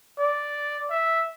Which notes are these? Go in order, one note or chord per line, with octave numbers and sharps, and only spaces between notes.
D5
E5